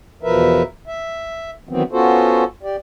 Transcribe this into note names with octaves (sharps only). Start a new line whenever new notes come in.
E2 B2 F3 A#4 B4 E5
E5
D#3 E3 F#3 B3 C4
B3 C#4 F4 F#4 A4 C5
G4 D5